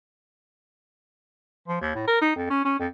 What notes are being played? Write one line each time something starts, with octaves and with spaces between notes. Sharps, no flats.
F3
D#2
A2
A#4
D#4
F2
C#4
C#4
F2